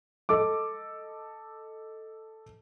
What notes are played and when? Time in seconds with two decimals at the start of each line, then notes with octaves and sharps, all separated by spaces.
0.29 A4 D#5 D6